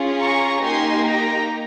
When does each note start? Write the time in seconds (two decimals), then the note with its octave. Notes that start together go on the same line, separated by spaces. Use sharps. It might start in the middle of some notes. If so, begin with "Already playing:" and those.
Already playing: C#4 F4 G#4
0.20 A#5 C#6
0.63 A#3 D#4 G4 G#5 C6
1.06 G5 A#5